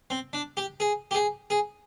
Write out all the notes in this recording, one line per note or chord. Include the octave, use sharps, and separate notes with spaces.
C4
D4
G4
G#4
G4
G#4
G#4